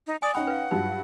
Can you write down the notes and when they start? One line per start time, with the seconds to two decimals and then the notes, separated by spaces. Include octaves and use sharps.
0.07 D#4
0.22 D5 G#5 D#6
0.35 C#4 D#4 F#5 G5 B5
0.47 B4 F5
0.71 G2 F#3 D#4 F4